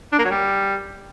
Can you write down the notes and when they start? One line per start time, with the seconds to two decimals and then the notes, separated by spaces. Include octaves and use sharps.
0.13 D4
0.19 A#3
0.25 F#3
0.31 G3